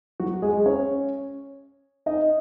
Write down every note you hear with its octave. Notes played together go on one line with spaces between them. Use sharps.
F#3 F#4
G#3 G#4
C#4 C#5
D#4 D#5